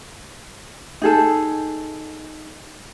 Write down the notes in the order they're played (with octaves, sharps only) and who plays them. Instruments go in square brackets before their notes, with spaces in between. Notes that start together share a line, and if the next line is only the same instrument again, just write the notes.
[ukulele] D#4 G#4 A4